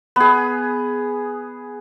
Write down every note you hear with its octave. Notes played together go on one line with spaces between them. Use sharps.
B3 G#4